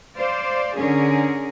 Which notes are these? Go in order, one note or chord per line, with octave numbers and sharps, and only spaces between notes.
C5 D5 F5
D3 C#4 G#4 A#4